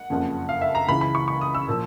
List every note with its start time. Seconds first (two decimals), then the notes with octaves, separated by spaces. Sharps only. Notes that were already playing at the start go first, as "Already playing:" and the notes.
Already playing: F#5
0.10 F#1 F2 C#3 F3
0.49 F5
0.61 E5
0.75 A#5
0.88 C#2 C#3 E3 B5
1.01 B5
1.15 C#6
1.28 C#6
1.41 D#6
1.55 E6
1.68 A#2 F3